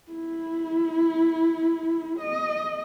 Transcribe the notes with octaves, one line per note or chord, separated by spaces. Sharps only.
E4
D#5